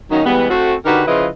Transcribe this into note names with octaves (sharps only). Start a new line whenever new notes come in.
D#3 F#3 A#3 C#4 D#4
E3 G3 G#3 B3
A3 C4 F#4
D3 D#4 F#4 G4 A#4 B4
C#3 F3 E4 F4 B4 D#5